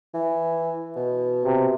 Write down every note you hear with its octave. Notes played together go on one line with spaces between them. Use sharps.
E3
B2
C3